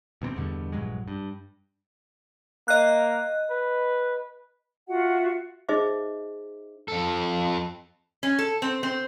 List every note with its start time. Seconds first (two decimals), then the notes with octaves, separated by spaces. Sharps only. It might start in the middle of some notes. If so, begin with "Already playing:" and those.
0.22 D2 B2 B3 C4
0.36 E2 G2 B2 D3
0.72 A#1 G2 F#3 G#3
1.08 G2
2.68 A#3 D#5 F#6
3.50 B4
4.87 F4 F#4 E5 F#5
5.69 D#4 G#4 C5 D#5 E5 D6
6.88 F2 A4
8.23 C#4
8.39 A4
8.62 C4
8.83 C4